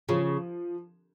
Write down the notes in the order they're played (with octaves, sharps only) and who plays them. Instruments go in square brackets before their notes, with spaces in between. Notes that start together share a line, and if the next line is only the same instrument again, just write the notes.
[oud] C#3 [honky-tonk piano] F3